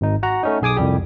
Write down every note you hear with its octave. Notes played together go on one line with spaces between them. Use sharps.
G#1 D#4
F#4 F#5 A#5
A3 C#4 D#4
B1 G#4 G#5 D6 D#6
C2 F2 G3 G4